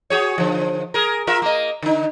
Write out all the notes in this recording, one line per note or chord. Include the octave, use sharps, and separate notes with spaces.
F#4 G#4 C#5
D3 F3
G#4 A#4
F4 A#4 E5
A#3 D#5
D3 D#4